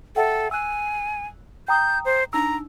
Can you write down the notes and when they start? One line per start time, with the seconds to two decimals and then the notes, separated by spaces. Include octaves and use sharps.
0.16 A4 E5 F#5 G5
0.51 G#5 E6 F#6
1.68 G5 A#5 D#6 G6
2.05 C5
2.33 D4 D#4 A#5 E6